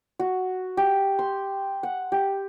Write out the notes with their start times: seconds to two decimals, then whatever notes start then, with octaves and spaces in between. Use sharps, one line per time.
0.19 F#4
0.77 G4
1.19 C6
1.83 F#5
2.12 G4